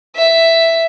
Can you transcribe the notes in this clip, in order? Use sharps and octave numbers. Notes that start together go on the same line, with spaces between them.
E5